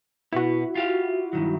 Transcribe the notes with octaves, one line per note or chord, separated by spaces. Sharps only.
B2 B3 E4 F#4
F4 G4 F5
G2 D#3 F#3